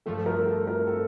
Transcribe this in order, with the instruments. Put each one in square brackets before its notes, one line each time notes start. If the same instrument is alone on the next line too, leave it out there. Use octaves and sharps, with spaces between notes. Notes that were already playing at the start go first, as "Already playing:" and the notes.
[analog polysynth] G2 F3 A3 [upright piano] A4
[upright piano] A#4
A4
A#4
A4